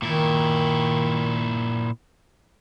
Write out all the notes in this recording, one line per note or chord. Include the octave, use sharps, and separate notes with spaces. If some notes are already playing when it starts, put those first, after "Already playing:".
A#2 D#3 E4